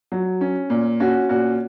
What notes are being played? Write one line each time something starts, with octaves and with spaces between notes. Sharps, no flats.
F#3
C#4
A#2
C#4 F#4
A#2 F#4